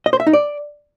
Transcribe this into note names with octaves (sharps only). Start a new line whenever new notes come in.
D#5
C5
E5
D#4
D5